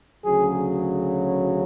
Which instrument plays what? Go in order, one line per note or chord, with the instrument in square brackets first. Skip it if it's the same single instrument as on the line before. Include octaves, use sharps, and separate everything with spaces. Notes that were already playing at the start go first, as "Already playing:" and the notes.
[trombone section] D2 C#3 F#3 G#4